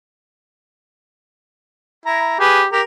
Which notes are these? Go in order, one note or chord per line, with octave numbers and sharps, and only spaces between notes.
E4 A#5
G4 G#4 B4
G4 A#4